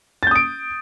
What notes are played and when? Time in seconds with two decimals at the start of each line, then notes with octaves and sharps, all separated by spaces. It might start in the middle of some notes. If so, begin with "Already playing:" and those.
0.23 A6
0.27 G6
0.31 D#6
0.35 D7